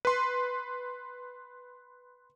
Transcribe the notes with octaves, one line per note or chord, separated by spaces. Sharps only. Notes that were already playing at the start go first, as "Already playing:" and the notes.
B4 C6